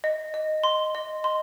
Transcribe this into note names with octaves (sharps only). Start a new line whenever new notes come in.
D#5
D#5
C6
D#5
C6